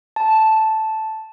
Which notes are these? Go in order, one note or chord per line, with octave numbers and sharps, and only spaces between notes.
A5